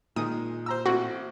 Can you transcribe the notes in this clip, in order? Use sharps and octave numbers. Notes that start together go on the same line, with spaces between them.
A#2 D#3 G#3 D#6
C5 A#5 E6
A1 C4 F#4